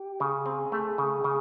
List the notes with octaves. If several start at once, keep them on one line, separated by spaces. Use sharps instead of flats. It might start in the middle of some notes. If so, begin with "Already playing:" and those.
Already playing: G4
C#3 G#4
C4
A3
C#3
C#3